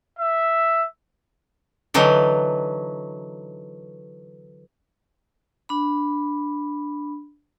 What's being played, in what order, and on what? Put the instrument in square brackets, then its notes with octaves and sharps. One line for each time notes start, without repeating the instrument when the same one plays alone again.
[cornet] E5
[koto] D3 E3 F#3 D#4
[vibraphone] D4 B5